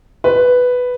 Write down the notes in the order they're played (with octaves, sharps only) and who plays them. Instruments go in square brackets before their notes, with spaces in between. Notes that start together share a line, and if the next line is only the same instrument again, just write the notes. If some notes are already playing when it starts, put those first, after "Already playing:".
[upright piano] B4